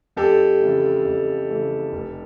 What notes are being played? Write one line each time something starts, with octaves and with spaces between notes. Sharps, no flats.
F2 G4 A4
C#3 E3 A3
F2
C#3 E3 A3
F1